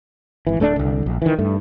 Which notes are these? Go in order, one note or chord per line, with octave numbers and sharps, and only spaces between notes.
G#1 E3
D1 A3 C4 D4
C2 D3
A#1
D#3 E3
G2 A3